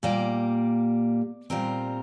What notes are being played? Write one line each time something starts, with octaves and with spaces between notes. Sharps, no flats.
A#2 G3 A#3 D5
A#2 G3 C4 A#4